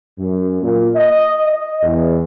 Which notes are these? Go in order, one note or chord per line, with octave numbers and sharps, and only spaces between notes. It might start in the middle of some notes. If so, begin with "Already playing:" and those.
F#2
A#2
D#5
D#5
E2